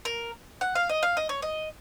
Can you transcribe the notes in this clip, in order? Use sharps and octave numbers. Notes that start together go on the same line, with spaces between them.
A#4
F#5
F5
D#5
F5
D#5
C#5
D#5